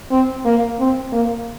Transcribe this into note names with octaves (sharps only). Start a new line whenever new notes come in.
C4
A#3
C4
A#3